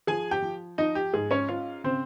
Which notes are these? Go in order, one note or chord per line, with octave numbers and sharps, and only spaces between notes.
F3 G#4 G#5
G4 G5
F3
F3 D#4 D#5
G4
G#2 G#4
C#4 C#5
C#4 F4 F5
C#3 C4 C5